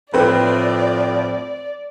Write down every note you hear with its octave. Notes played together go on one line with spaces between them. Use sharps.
A2 F3 C4 B4 D5